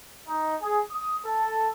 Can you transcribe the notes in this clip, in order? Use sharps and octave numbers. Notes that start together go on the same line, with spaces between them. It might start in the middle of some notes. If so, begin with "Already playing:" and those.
D#4
G#4
D#6
A4